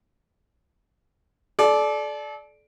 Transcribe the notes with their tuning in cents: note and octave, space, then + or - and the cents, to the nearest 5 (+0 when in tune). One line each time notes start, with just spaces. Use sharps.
A4 -35 D5 +0